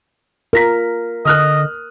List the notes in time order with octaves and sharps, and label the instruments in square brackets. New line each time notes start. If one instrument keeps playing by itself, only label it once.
[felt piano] F4 A#6 B6 [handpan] A#4
[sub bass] D3 [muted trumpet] D#5 [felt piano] D#6 F6 F#6